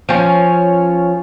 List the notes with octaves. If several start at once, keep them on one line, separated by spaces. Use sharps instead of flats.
F3 C#4